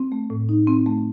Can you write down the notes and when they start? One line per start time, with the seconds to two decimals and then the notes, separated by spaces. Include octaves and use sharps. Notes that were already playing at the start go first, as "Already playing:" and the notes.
Already playing: C4
0.12 A3
0.30 A2
0.49 D#4
0.67 C4
0.86 A3